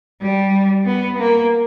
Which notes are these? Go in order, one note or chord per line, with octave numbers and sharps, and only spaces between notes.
G3
B3
A#3